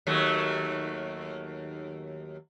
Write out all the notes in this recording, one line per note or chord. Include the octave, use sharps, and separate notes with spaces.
D#2 F#3 A3